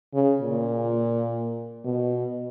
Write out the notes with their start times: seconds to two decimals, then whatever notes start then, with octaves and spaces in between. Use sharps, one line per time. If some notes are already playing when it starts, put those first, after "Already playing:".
0.14 C#3
0.41 A#2
1.85 B2